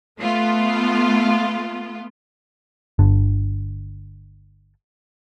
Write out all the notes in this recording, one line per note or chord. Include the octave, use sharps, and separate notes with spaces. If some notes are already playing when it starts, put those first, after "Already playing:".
A3 B3 F4
G1 D3